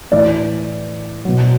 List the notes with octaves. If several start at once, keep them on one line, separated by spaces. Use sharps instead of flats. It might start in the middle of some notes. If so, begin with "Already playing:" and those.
A2 E3 D5
B2 F#3